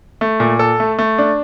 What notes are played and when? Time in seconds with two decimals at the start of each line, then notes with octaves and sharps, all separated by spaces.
0.21 A3
0.40 A#2
0.59 A4
0.80 A3
0.99 A3
1.18 D4